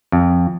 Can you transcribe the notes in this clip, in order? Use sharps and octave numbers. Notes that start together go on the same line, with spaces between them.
F2